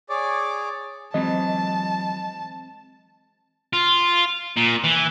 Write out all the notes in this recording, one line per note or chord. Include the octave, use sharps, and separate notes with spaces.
G#4 C#5 D5 D6
E3 F#3 G#3 C4 D#5 A5
F4
A#2
E3